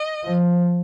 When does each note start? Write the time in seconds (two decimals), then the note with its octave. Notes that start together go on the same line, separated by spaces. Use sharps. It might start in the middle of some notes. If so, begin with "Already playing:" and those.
Already playing: D#5
0.25 F3